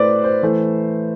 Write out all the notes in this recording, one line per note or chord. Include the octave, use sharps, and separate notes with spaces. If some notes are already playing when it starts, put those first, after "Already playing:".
Already playing: A2 A3 B4 C5 D5
C5
E3 A3